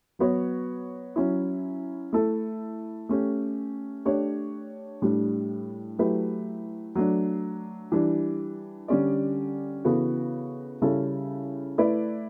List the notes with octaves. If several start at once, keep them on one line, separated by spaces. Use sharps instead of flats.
F#3 B3 F#4 C#5
F#3 C#4 E4
A3 E4 A4
A3 C#4 G4
A3 D4 G4 C#5
A2 G3 D4
F#3 A3 E4 G4 B4
F#3 A3 D4
E3 G3 D4
D3 G3 C#4 G4 D5
C#3 E3 B3 F#4 A4
C#3 G3 C#4 E4 A4
A3 E4 B4 D5